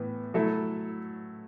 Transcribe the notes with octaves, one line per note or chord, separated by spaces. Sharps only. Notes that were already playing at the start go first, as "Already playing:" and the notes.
Already playing: A2 E3 B3
F#3 A3 E4 A4